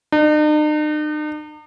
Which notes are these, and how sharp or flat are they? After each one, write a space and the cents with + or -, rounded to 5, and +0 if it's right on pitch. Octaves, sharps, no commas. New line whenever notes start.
D#4 -45